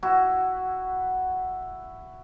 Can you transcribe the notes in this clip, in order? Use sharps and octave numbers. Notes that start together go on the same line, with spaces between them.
E4 F#4